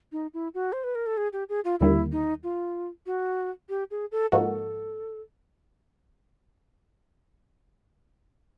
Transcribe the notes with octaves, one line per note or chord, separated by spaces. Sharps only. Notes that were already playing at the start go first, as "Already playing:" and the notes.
D#4
E4
F#4
C5
B4
A#4
A4
G#4
G4
G#4
F4
D#2 D3 G3 A#3 E4
D#4
F4
F#4
G4
G#4
A4
G#2 F3 A#3 D#4 F#4 A4